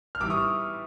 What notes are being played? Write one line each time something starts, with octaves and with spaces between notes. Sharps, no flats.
F6
E3 G3 D6 E6
C#6 D#6